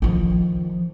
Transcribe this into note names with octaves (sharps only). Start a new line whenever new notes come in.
D#3 F3